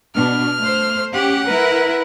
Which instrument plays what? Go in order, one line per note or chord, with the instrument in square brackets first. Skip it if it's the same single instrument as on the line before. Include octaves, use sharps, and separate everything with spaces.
[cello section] B2 D4 [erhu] F6
[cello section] A3 C5
[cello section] C#4 G4 [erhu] F#5
[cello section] E4 A#4 B4